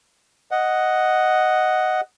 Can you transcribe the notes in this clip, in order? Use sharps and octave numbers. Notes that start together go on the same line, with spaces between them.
D#5 F#5